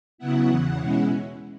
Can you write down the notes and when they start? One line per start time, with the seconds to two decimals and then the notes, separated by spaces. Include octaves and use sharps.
0.18 C#3 F#3 B3 E4 F#5
0.49 E2 C#3 E3
0.79 B2 G#3 C#4 E4